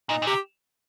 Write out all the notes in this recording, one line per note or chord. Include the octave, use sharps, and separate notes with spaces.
A#2 D#4
A#2
C3 G4